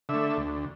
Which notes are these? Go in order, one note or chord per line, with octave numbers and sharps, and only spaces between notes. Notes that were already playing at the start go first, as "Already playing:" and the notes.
D3 A3 E5
D2